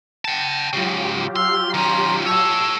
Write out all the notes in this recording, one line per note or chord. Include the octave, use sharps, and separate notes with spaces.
F#5 G5 A5 A#6
G#2 C#3 F#3 F4 G4
C6 E6 F6
D#3 C#4 A#5 C6
A4 C#5 A5 E6